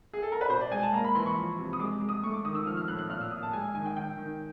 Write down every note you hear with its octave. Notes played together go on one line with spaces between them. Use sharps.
G#4
A4
A#4
B4
B2 C5
D5
G#3 G#5
A5
A#3 A#5
B5
E3 C6
C#6
F3
C3
D#6
G#3 D6
G#3
D#6
A3 C#6
D6
D#3 D#6
E6
F3 F6
F6
A2 F#6
F#6
A#2 F6
E6
A#2 D#6
A5
G#3 G#5
G#5
D#3 G#5
G5
D#3 G5
D#3